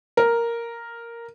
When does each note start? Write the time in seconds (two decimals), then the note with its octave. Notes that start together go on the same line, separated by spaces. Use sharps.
0.17 A#4